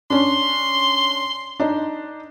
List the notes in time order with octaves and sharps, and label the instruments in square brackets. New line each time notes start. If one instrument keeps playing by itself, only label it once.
[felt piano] C#4 D4 [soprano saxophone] C6
[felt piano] D4 D#4